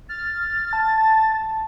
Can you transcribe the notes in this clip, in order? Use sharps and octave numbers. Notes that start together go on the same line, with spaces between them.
F6 A6
A5